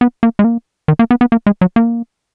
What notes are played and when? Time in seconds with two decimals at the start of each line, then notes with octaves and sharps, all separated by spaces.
0.01 B3
0.23 A#3
0.39 G#3
0.44 A#3
0.88 D#3
0.99 A#3
1.11 B3
1.21 B3
1.32 A#3
1.46 G#3
1.61 F#3
1.76 A#3